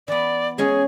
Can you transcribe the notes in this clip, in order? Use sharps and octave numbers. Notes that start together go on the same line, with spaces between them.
E3 B3 D5
G#3 C#4 G#4 G#5